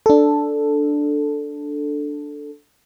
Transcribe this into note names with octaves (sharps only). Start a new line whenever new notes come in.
D4 A4